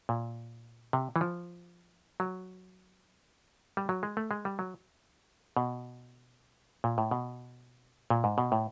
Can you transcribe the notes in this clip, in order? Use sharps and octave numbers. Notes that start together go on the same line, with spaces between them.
A#2
C3
E3
F3
F#3
G3
F#3
G#3
A3
G#3
G3
F#3
B2
A#2
A2
B2
A#2
G#2
B2
A2